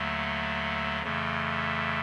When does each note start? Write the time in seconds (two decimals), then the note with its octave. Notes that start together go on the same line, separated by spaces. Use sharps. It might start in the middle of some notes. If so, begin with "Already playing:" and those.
Already playing: D#2 D3 F#3 A3
1.03 F2 C#3 E3 A3